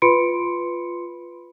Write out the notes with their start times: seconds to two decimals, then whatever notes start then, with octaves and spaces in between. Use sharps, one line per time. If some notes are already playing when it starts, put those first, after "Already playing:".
0.02 F4 B4 B5 C6 C#7 D7